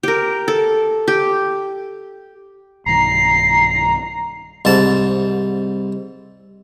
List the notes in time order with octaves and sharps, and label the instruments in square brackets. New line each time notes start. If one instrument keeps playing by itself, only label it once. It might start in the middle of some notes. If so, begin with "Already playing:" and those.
[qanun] G4 A#4
A4
G4
[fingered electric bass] B1 G2 D#3 [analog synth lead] A#5 [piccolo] C7
[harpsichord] C2 G#2 A5